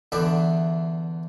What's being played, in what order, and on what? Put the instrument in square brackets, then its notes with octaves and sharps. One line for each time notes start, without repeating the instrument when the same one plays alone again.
[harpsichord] E2 D3 E3 D5 E5